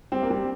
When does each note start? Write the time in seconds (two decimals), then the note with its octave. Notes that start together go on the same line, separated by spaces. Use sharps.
0.12 G3 C4
0.22 A#3
0.30 G3 C4